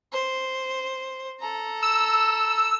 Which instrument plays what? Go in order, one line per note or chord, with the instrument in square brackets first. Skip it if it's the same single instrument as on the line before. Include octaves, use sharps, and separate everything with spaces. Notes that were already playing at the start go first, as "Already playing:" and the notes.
[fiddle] C5
A4 A#5
[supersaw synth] E6